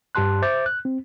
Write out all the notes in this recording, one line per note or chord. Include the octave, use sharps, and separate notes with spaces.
G2 G4 A5 C6 F#6
C5 E5 D6 G6 A6
F#6
C4